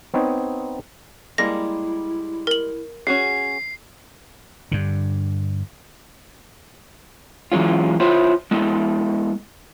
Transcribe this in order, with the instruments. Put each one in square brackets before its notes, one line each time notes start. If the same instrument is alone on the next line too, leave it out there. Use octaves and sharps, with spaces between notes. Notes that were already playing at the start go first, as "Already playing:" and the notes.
[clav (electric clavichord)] B3 C4 D#4 C#5
[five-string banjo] G3 G#3 A#3 [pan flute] E4 [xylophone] A#6
[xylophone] A#4 F#7
[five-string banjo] C#4 F#4 G#4 [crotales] C7
[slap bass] G2 D3
[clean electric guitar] E3 F#3 G#3 C#4 F4
E4 F4 C5 C#5 E5
G#3 B3 E4 A4